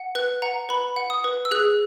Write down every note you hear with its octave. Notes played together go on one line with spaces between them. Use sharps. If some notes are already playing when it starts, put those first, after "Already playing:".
Already playing: F#5
B4 F#6
F#5 A#5
B4 B5
F#5
D#6
B4
E6
G#4 F#6